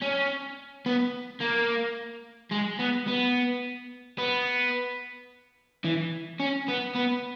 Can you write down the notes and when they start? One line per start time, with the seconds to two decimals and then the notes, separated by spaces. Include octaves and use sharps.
0.02 C#4
0.86 B3
1.40 A#3
2.52 G#3
2.79 B3
3.08 B3
4.18 B3
5.84 E3
6.40 C#4
6.68 B3
6.95 B3